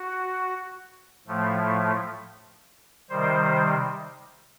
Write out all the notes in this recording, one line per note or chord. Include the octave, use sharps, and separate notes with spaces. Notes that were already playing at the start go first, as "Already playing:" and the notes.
Already playing: F#4
A2 F3 A3
C3 D#3 G3 C5